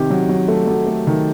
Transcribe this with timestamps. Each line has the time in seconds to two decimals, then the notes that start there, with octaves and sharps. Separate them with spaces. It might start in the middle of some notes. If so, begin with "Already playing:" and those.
Already playing: C3 D#3 G4
0.10 F#3
0.29 F#3
0.48 A3
0.67 F#3
0.87 A3
1.07 D#3